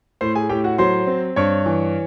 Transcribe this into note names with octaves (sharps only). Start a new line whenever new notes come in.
A2 C5 C6
G#4 G#5
A2 G4 G5
F#4 F#5
F#3 C5 C6
C4
G2 C#5 C#6
E3